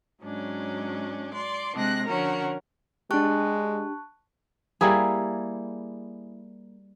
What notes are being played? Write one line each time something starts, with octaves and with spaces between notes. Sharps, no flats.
G#2 F#3 C#4 D4
D5 C6
C3 G#3 C4 D4 F#6 A#6
D3 F3 C#4 F#4 A#4
G#3 D4 G4 A5 C#6 F#6
G3 A#3 E4 G#4